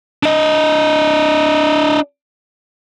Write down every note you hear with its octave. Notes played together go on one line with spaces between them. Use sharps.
D4 D#5